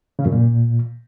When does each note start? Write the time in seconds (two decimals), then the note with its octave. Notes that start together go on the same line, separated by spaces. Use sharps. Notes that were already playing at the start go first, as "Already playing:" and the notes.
0.19 C#3
0.26 F#2
0.32 A#2